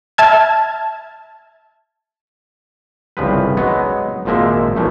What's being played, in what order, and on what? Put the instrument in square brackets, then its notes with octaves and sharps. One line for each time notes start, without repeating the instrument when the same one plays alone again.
[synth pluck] E5 A5 F6 G#6
[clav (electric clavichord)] G1 C2 C#3 F3 C4 B4
F#3 G#3 B3 D#4
G#1 A#2 F3 G#3 A#3 E5
B1 A#2 E3 F3 A3